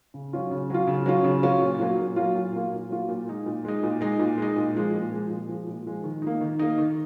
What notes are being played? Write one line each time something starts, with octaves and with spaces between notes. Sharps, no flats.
C#3
F#3 C#4 F4
C#3
F#3 C#4 F4
C#3
F#3 C#4 F4
C#3
F#3 C#4 F4
A#2
F#3 A#3 F4
A#2
F#3 A#3 F4
A#2
F#3 A#3 F4
A#2
F#3 A#3 F4
A#2
G#3 D#4
A#2
G#3 D#4
A#2
G#3 D#4
A#2
G#3 D#4
A#2
F3 G#3
A#2
F3 G#3
A#2
F3 G#3
A#2
F3 G#3
D#3
A#3 D#4
D#3
A#3 D#4
D#3